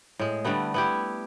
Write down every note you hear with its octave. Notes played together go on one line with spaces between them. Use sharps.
A2 G#3
D3 G3 A3 B3
B3 E4 G4